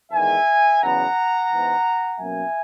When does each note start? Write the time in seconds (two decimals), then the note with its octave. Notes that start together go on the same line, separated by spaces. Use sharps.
0.12 E2 D#3 G#3 E5 G#5
0.82 E2 C#3 F#3 B3 F#5 A#5
1.51 G#2 E3 G#3 B3
2.19 B2 F#3 A#3 C#4 E5 G#5